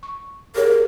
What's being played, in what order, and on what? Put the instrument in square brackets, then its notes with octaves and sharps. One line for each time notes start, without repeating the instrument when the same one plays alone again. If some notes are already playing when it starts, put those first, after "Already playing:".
[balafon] C#6
[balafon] G4 G#4 C#5 [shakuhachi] A#4